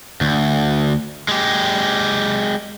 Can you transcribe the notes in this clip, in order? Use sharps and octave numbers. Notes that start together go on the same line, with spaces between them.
D2
G#3 G4